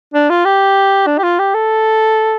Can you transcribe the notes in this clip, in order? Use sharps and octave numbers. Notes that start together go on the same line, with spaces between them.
D4
F4
G4
D4
G4
F4
G4
A4